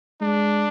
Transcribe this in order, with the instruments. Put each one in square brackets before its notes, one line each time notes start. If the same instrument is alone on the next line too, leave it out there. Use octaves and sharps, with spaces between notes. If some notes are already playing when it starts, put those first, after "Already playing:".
[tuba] G#3 [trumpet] D4